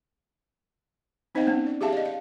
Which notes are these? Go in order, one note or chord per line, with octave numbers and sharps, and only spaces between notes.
C4 D#4 C5 D#5 F5 G5
B3 C#4
D5
G4 G#4 E5 F5 A5
D5 D#5
F5